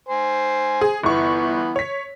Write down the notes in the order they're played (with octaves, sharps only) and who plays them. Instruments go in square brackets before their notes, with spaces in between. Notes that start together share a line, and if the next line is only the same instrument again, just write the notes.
[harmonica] C5 G#5
[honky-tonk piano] G#4
[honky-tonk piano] G1 C#6 [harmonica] E3 B3
[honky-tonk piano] C#5 B6